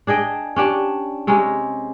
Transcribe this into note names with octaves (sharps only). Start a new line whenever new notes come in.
D4 G#4 D#5 G5
C#4 D4 G4
C3 G#3 C#4 D#4